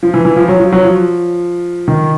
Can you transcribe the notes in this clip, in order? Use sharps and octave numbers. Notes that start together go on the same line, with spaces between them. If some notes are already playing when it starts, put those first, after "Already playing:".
F3
E3
E3
F3
F#3
F3
F#3
F3
D#3